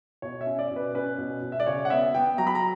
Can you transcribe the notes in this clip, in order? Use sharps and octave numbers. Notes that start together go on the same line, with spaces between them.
B2 C#5
E5
C#4
D5
B2
B4
C#4 B4
B2
B2
E5
D5
C#3 C#5
F#5
B3 E5
B3 G5
F#3 A#5
B5
A#5